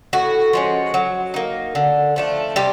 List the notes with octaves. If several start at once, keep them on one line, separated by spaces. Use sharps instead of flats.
A2 F#4
F3 G#3 C#4
F#3
A#3 D#4
D3
F3 A3 D4
C3 G3 G4